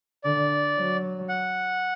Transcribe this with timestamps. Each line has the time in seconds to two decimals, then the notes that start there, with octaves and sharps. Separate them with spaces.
0.24 D3 D5
0.77 F#3
1.29 F#5